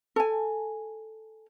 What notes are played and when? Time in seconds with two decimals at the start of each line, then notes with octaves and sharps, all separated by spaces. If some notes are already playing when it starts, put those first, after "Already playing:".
0.16 A4 G#5